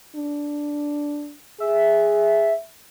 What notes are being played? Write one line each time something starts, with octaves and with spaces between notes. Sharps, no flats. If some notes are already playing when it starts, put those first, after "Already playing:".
D4
G#4 E5